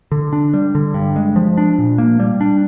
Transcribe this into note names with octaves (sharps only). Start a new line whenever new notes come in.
D3
D4
G3
D3
G2
G#3
F3
D4
A#2
A#3
G3
D4